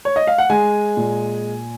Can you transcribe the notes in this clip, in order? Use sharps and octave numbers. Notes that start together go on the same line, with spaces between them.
C#5
D#5
F5
F#5
G#3 G#5
A#2